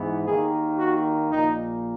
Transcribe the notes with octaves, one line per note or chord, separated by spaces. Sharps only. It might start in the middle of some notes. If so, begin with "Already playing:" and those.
Already playing: G#2 E3 B3
D#2 D#3 A#3 G#4
F#4
A#1 A#2 A#3 D#4